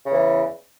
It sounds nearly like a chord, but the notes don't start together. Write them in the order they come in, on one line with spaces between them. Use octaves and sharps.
C#3 E2 E3